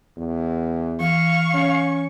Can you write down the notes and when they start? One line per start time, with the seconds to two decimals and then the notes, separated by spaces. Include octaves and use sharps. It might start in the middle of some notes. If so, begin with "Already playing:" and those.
0.17 E2
1.00 E3 F5 C#6
1.54 C#4